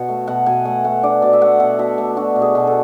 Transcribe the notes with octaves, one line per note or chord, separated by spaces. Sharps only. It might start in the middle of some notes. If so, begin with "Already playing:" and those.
Already playing: B2 F#5
A3
B2 F#5
B2 G#5
A3 F#5
A3 F#5
D4 D5
B2 D5
E5
A3 F#5
B2 F#5
B2 E5
A3
D4 F#4
B2
G#4
B2
A4